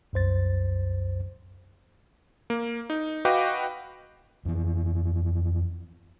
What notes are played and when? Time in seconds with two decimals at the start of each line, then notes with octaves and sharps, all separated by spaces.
0.13 C2 F#2 C5 A6
2.50 A#3
2.90 D#4
3.25 F#4 B4 D#5 F5 G5 D6
4.45 F2 E3